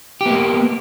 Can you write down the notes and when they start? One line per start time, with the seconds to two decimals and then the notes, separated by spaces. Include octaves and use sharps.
0.21 G4
0.26 B3
0.31 A#3